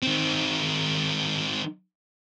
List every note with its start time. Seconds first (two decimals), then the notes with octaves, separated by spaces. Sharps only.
0.02 D#3 C4